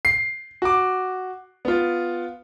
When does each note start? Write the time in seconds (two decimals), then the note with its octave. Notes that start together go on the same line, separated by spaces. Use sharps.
0.05 C7
0.62 F#4 D6
1.65 B3 F4